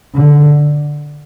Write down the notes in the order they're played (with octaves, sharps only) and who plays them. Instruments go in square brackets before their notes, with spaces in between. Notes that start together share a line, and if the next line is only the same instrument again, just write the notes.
[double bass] D3